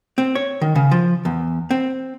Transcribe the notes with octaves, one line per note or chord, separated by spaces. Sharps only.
C4
C#5
D#3
C#3
F3
E2
C4